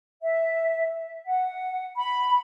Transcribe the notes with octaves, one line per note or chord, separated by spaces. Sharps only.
E5
F#5
B5